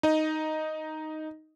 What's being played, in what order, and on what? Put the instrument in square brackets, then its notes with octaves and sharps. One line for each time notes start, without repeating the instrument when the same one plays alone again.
[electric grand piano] D#4 D#5